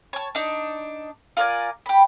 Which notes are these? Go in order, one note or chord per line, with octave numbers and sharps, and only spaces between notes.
C#5 A5
D4 D#4
F4 A#4 D5 G#5
G4 B5